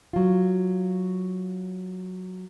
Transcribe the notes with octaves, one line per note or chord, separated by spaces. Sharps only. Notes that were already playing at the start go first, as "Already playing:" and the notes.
F#3 F4